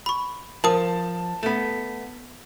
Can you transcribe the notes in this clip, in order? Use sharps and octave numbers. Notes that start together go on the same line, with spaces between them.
B5 C#6
F3 A#4 A5 D#6
A3 B3